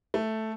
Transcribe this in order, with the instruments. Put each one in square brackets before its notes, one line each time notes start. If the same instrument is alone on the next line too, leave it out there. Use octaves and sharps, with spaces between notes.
[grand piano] A3